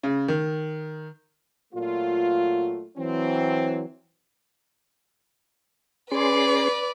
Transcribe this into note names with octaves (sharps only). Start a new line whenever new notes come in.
C#3
D#3
A#2 F#3 A3 F4
E3 F#3 C4
C#4 G#4 B4 D5 C6